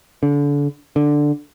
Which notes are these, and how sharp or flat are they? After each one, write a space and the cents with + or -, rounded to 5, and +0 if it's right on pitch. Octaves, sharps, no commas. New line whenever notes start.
D3 -30
D3 +5